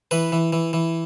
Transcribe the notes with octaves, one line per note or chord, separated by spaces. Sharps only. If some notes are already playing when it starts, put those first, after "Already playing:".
E3 B4
E3
E3
E3